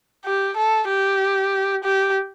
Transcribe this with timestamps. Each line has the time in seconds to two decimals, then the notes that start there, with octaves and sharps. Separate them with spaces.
0.25 G4
0.57 A4
0.89 G4
1.84 G4